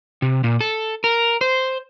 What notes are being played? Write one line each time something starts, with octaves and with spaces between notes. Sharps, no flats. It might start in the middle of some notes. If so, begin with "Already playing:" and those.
C3
A#2
A4
A#4
C5